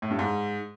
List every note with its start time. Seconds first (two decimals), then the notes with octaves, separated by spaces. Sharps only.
0.02 A2
0.11 G2
0.19 G#2